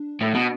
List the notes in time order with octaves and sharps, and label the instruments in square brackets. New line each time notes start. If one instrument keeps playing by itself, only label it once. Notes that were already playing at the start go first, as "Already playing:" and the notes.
Already playing: [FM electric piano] D4
[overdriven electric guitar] A2
B2